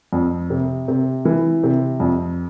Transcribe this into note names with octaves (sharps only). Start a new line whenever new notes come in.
F2
C3
C3
E3
C3
F2